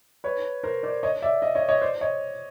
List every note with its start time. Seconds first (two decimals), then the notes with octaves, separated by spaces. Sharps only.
0.24 B4 C#5
0.63 A#4 C5
0.83 C5 D5
1.03 C#5 D#5
1.22 D5 E5
1.42 D#5 F5
1.55 C#5 D#5
1.68 C#5 D#5
1.82 C5 D5
2.01 C#5 D#5